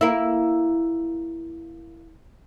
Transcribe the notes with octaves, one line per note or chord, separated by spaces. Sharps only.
A#3 E4